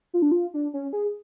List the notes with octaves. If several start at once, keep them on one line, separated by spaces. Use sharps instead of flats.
F4
D4
F4
D4
C#4
G#4